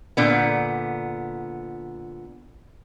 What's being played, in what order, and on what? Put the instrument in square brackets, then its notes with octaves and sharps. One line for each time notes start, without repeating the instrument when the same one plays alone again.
[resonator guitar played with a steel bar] A#2 D3 B3